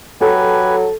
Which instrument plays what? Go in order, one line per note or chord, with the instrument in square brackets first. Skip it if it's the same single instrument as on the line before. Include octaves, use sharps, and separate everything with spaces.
[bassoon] F#3 [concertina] G4 B4 G#5 [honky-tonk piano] A4